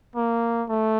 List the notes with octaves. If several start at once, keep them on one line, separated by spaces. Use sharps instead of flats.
A#3
A3